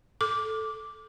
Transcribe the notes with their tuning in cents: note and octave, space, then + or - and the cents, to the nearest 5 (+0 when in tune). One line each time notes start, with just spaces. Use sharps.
A4 +0 D6 -5